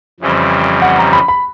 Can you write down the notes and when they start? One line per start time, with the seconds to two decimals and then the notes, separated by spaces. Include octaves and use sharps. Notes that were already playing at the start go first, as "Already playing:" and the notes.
0.20 F2 C#3 E3 G3 C4
0.82 F#5
0.98 A#5
1.13 B5
1.28 B5